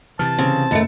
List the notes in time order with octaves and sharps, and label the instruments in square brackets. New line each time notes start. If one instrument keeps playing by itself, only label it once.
[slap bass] C3 E3 [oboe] A5 [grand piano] F6 A6
[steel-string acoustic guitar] C#3 [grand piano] C4
[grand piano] F#1 A6 C#7 [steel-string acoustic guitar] D#2 A3